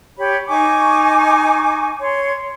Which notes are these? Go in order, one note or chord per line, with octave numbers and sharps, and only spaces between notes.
G4 C#5 B5
D#4 G#5 C#6 D6
C#5 C6